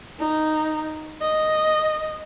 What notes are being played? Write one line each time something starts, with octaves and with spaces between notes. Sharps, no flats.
D#4
D#5